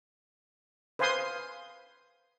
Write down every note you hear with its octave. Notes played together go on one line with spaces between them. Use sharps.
B4 C5 F5 G#5 C6 D#6